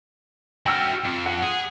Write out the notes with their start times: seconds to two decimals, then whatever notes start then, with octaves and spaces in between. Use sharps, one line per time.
0.66 F#4 E5 G5 E6 F6
1.04 F2
1.26 F#5
1.42 G#4